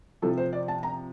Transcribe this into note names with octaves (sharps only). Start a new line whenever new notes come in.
C3 F3 A4
C5
D5
A5
A#5